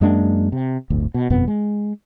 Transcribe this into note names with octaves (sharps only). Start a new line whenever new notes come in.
F#2 G#3 A#3 D4
C3
D1 G1 D2
B2
G1 F2 B2 B3
G#3